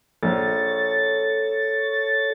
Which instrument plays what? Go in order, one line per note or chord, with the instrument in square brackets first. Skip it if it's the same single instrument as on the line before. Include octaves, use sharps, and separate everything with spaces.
[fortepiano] A#1 [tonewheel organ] A4 C#5 A6